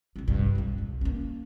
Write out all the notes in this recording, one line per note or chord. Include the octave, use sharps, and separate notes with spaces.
C2 C3
A#1 G2
B1 E2
C2
A#3 C#4